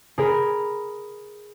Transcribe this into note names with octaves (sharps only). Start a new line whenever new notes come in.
G#4 A#4 B5